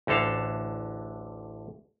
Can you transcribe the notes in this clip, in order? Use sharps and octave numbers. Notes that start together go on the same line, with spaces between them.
A1 D2 D3 A4 F5